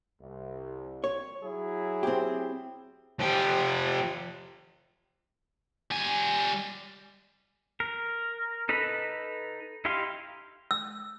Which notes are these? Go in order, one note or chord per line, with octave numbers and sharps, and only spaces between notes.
C2
C#5
F#3 E4 G#4
C4 G4
F3 G4
G3 G#5
A#4
D#4 A4 B4 A#5 B5
D#4 E4 G4 F5 C6
E6